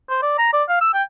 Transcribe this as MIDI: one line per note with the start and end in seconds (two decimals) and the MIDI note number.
0.10 0.18 72
0.23 0.34 74
0.39 0.50 82
0.54 0.63 74
0.69 0.80 77
0.81 0.90 88
0.94 1.03 79